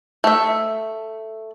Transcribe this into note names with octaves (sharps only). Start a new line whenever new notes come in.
A3 E5